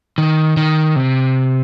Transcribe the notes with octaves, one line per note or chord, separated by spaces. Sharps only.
D#3
D#3
C3